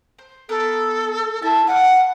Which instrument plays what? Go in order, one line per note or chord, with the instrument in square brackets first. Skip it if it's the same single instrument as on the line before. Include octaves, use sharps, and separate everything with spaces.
[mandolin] C5
[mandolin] B3 A#4 [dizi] A4
[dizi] E4 [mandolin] A5
[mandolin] B4 D5 F5 [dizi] F#5